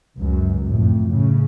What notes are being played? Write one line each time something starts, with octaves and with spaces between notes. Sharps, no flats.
C#2 F#2
F2 A2
A2 C#3